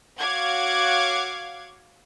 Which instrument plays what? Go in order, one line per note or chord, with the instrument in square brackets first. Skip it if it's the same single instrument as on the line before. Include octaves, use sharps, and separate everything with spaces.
[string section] F#4 C#5 F5 F#5 D6 G#6